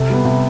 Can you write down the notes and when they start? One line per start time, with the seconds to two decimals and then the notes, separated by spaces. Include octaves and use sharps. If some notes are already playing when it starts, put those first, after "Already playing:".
Already playing: C3 A4
0.10 G3 B3
0.25 C3